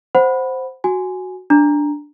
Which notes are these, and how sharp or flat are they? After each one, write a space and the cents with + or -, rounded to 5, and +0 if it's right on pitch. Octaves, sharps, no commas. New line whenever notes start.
C5 +0 F#5 +0 B5 +0
F#4 +0 G#5 +0
D4 +0 A#5 +0